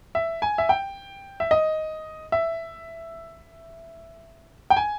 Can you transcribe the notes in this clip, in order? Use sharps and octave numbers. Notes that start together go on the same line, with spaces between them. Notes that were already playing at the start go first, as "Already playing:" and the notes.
E5
G#5
E5
G5
E5
D#5
E5
G5
G#5